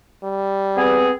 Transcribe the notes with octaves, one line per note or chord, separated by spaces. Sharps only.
G3
B3 C4 G#4